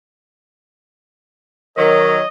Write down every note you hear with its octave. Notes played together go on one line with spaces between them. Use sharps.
D#3 F#3 A#4 C#5 D#5